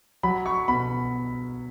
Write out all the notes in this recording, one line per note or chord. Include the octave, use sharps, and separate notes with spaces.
F#3 B5
C#6
B2 B5